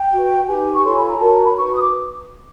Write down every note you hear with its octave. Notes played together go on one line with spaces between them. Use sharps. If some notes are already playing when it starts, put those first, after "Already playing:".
Already playing: G5
F#4 B4
D#4 G4 B4 G#5
C#6
F4 A4 C#5 C6
B5
A#5
F#4 A#4 C#5 A5
A#5
B5
D#4 F#4 B4 C#6
D#6
D6